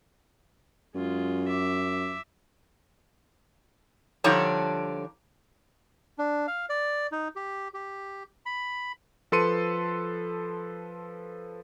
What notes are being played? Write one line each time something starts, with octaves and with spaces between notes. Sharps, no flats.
F#2 G#3 F4
E5 D6
D3 F3 G3 D4 D#4 C#5
D4
F5
D5
D#4
G4
G4
B5
F3 A4 B4 C6 C#7 D#7